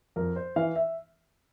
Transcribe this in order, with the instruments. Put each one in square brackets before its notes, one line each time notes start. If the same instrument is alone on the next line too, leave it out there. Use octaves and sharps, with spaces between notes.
[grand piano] F2 A#4
C5
E3 F5
E5